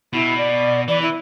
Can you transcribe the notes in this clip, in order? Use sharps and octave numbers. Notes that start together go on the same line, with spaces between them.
B2 E4
D5
E3 D5
E4